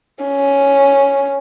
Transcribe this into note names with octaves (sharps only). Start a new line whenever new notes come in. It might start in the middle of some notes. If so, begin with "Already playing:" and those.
C#4